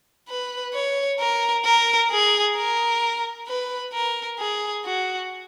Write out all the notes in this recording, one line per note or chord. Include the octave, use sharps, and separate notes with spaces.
B4
C#5
A#4
A#4
G#4
A#4
B4
A#4
G#4
F#4